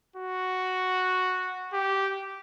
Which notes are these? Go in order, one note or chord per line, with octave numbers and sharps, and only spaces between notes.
F#4
G4